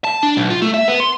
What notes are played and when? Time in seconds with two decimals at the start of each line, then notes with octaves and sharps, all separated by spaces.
0.04 A5
0.23 D4
0.37 B1
0.50 F4
0.62 A3
0.74 E5
0.88 B3
1.00 C6